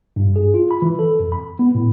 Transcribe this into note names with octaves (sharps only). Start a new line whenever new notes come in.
G2
G#4
F4
B5
E3
A4
F2
B5
B3
A2